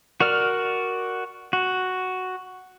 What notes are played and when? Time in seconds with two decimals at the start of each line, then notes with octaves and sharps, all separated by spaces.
0.20 F#4 A#4 D5 F6
1.53 F#4